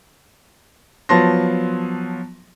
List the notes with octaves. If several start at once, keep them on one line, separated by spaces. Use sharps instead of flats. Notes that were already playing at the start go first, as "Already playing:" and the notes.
F3 F#3 B3 A5 C6 A#6